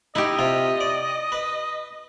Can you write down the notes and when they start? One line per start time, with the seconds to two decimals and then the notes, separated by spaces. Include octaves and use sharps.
0.15 D#4 E4 G4 D#5
0.39 C3 F4
0.80 D5
1.32 B4